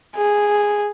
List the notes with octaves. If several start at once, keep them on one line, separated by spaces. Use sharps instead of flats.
G#4